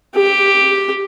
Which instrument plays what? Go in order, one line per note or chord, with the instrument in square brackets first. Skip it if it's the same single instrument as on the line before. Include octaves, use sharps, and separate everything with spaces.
[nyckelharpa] G4